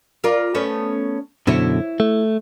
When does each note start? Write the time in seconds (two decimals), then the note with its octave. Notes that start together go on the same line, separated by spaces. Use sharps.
0.24 F4 A#4 D5
0.54 A3 B3 C#4
1.47 F#2 B2 D3 E4 C#5
2.00 A3